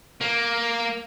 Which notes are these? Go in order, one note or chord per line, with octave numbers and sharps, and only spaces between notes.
A#3